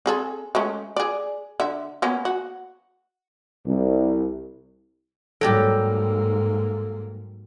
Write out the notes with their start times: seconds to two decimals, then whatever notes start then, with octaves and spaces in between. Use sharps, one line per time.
0.06 C4 G#4 A4
0.55 G#3 A3 C#4
0.96 G#4 D5
1.60 D3 E5
2.02 A#3 B3 C#4
2.25 F#4
3.66 C2
5.41 G#2 F#3 G3 A#3 G4 A4